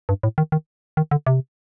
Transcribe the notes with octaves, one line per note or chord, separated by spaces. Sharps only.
G2
A2
D#3
D#3
D#3
D3
C3